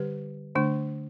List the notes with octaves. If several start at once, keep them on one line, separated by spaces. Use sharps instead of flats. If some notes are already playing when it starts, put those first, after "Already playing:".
Already playing: D3 G3 G4 B4
D3 A3 D4